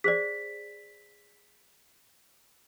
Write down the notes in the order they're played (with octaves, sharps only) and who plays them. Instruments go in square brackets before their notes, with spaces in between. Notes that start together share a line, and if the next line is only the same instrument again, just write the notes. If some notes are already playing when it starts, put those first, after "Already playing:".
[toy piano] G#4 C5 D5 [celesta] B6